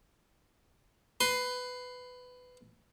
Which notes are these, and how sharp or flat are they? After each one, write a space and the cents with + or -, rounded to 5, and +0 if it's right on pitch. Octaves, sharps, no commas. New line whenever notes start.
B4 +15 C6 +0